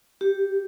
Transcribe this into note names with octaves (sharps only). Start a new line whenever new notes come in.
G4